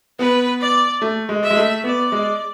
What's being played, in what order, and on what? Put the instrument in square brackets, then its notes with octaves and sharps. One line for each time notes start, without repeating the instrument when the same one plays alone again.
[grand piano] B3 [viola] B4
[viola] D5
[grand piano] A3
G#3
[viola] E5
[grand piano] G#3
A3
[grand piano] B3 [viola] D5
[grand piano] G#3